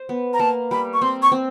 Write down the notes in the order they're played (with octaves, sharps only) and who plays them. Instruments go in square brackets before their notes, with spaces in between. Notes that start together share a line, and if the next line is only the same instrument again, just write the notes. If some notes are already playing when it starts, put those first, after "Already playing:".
Already playing: [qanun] C5
B3
[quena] A#5
[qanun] A#3 [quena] A5
[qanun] G3 [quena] B5
[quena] C#6
[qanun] C4 [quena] C6
[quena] C#6
[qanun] C4